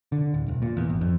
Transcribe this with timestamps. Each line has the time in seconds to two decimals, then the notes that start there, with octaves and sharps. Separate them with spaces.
0.12 D3
0.34 D1
0.48 E1
0.62 A#2
0.77 E2
0.89 G#1
1.01 F2